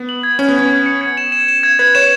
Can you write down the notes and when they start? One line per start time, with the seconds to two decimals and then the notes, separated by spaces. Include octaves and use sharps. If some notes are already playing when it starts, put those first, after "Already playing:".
Already playing: B3
0.09 F#7
0.23 G#6
0.39 C#4 G#6
0.49 B3
0.55 C#4 G#6
0.70 G#6
0.86 C#7
1.01 G#6
1.17 E7
1.32 E7
1.48 E7
1.63 G#6
1.79 B4 G#6
1.95 C#5 E7